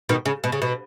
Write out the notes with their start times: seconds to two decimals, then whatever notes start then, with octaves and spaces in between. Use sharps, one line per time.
0.09 B2 D#3
0.26 C#3
0.44 B2
0.52 C#3
0.62 B2